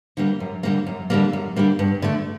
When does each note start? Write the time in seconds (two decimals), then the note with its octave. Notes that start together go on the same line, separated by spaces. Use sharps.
0.17 D3 G3 A#3
0.40 F#2
0.63 D3 G3 A#3
0.86 F#2
1.10 D3 G3 A#3
1.33 F#2
1.56 D3 G3 A#3
1.79 G2
2.02 D3 A3